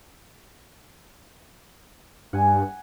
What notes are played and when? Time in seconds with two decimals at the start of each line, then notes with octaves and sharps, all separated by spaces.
2.33 G2 F#5 G#5